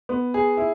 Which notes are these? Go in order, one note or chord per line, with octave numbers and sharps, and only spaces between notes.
B3
G#4
E4